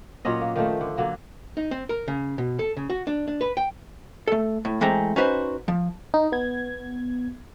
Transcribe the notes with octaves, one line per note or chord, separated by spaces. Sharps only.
A#2 F#3 C#4 D#5
A#3
D#3 F3 A3
D3
D3 F#3 A#3
D#4
C4
A#4
C#3
B2
A4
C#3
F#4
D4
D4
B4
G5
A3 A4
A2
E3 G#3 A3 C4 A#5
C#4 D#4 F#4 B4 C5
F3
D#4
B3 G#6